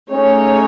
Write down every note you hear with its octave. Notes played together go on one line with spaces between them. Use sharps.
A3 C#4 D#4 G#4 C#5